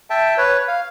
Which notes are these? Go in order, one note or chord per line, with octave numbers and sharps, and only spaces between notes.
E5 G5 A5
B4 C#5
F5